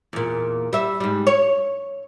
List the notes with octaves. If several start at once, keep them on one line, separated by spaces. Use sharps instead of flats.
E2 A#2
G3 E5
G#2 G3
C#5